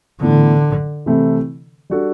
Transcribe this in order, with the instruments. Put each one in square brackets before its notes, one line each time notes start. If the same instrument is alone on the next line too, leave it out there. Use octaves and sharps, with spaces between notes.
[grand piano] A2 E3 B3 [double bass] D3
[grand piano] C3 E3 A3 C4 E4
G3 D4 F#4 A4